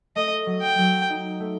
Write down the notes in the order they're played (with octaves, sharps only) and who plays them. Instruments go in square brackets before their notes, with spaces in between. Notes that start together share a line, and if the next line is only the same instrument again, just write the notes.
[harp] A3 [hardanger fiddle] D#5
[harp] F#3
[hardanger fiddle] G5
[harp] F#3
D#4
A3